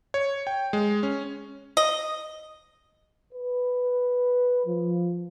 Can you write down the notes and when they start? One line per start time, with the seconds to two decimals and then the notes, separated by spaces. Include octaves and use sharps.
0.14 C#5
0.47 G5
0.73 G#3
1.03 C#4
1.77 D#5
3.34 B4
4.67 F3